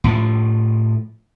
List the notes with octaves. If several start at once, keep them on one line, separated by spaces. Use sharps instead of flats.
A2 F3